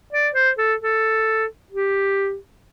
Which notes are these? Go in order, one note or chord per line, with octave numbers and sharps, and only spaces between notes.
D5
C5
A4
A4
G4